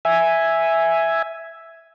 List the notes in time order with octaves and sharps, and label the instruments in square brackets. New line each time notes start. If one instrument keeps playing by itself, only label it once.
[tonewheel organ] E5 G#5